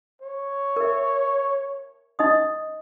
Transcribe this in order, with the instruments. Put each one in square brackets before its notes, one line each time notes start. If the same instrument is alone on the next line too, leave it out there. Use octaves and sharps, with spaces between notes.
[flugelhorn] C#5
[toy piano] A#4 E5
D#4 D#5 D#6